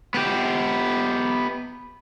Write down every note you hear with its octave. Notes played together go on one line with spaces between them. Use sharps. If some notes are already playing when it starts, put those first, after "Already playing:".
B3 G4